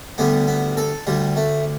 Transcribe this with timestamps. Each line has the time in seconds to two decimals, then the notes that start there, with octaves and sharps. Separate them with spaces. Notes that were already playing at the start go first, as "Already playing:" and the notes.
0.18 D2 D3 G3 B3
0.47 B3
0.77 A4
1.07 D2 D3 G3
1.36 A3